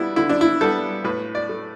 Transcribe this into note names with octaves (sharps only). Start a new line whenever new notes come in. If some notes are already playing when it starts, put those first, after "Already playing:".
Already playing: G3 B3 D4 E4
D3 E4
D4
E4
G3 B3 A4
A2 B4
D5
A3